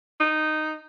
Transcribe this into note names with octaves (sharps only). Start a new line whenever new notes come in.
D#4